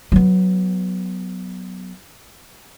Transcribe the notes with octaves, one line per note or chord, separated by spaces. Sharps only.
F#3 B3